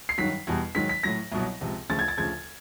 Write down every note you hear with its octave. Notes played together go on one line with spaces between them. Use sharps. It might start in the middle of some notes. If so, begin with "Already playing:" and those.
C7
G2 D#3 F#3 B6
E2 B2 G3
G#2 D#3 F#3 B6
B6
A2 F#3 A#6
C2 B2 F#3
C#2 C3 F3
D2 C#3 F3 A6
G#6
A6
D2 C#3 F3 G#6